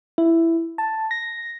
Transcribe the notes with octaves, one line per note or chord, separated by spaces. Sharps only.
E4
A5
A#6